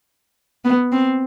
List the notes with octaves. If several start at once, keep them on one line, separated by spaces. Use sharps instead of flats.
B3
C4